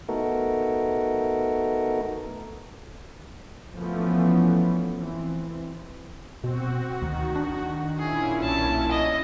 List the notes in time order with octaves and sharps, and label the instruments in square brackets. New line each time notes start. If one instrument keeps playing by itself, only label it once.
[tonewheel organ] A3 B3 D#4 F#4 A4 A#4
[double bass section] E3 F3 A3 B3 C#4
E3 C4
[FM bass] B2 [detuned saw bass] C4 [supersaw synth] F#4
[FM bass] D2 [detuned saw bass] D#3
[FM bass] D4
[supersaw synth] A#2 C#4 E4 [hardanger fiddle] G#4
[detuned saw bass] B1 [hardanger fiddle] A5
[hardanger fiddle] D#5